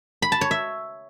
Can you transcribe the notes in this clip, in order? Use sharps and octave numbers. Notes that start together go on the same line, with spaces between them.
B5
A5
C#5
E5